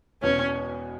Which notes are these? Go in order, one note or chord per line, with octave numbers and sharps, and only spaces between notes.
E1 E2 B2 C#4